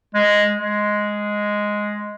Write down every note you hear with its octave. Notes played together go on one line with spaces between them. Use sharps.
G#3
G#3